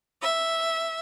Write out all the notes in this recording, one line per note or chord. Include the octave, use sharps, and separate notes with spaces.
E5